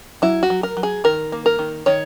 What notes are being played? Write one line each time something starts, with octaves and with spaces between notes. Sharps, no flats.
F#3 E4
F#4
F#3
A#4
F#3
G#4
D#3 A#4
A#3
A#4
D#3
D#3 C#5